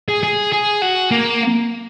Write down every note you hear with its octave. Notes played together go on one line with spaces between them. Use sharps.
G#4
G#4
G#4
F#4
A#3